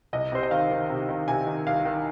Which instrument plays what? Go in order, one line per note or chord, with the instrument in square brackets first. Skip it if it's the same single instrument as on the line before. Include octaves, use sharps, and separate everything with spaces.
[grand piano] C2 D#5
C3 C5
D#5
D#3 F5
D#3
C3
D#3
C3 G#5
D#3
C2 F5
D#3